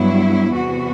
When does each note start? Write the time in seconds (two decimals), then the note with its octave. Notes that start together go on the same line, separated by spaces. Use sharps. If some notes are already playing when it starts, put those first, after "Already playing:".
Already playing: G2 F#3 B3 E4
0.53 E2 C3 E3 B3 F#4